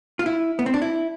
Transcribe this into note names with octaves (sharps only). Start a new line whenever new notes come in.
F4
E4
B3
C4
D4
E4